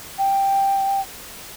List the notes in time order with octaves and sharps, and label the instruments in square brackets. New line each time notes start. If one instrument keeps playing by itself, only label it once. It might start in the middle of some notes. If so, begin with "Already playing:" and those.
[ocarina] G5